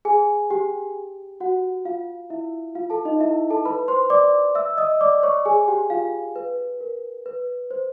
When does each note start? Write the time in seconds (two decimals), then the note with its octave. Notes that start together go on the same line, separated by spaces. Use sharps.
0.05 G#4 G#5
0.50 G4 G5
1.40 F#4 F#5
1.85 F4 F5
2.30 E4 E5
2.75 F4 F5
2.90 A4 A5
3.05 D#4 D#5
3.21 E4 E5
3.50 A4 A5
3.65 B4 B5
3.88 C5 C6
4.10 D5 D6
4.55 E5 E6
4.78 D#5 D#6
5.01 D5 D6
5.23 C#5 C#6
5.45 G#4 G#5
5.68 G4 G5
5.90 F4 F5
6.36 B4
6.81 A#4
7.26 B4
7.71 C5